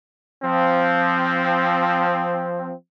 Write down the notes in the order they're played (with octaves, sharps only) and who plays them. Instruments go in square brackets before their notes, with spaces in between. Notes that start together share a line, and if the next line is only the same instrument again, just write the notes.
[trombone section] F3 C4